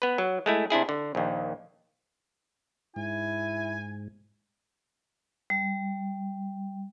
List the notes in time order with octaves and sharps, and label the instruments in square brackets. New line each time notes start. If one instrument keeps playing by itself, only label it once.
[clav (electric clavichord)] B3 B4
F#3
G#3 A3 E4
C3 D4 E4 G#4
D3
A#1 D#2
[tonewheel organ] G#2 [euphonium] E4 [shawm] G#5
[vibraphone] G3